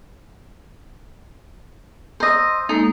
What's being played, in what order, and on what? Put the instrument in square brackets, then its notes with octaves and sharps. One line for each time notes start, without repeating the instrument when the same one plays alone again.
[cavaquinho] C5 D#5 [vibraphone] A#5 C6 E6
[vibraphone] G#3 A#3 A4 [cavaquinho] D#4